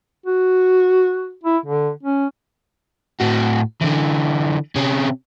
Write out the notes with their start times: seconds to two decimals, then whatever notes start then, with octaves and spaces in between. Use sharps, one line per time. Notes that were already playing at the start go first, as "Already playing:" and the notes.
0.26 F#4
1.43 E4
1.66 D3
2.03 C#4
3.20 A2 F#4
3.81 D3 E3
4.76 C3 C#4